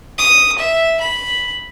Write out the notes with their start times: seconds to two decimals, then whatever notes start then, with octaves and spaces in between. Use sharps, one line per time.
0.19 D#6
0.58 E5
1.01 B5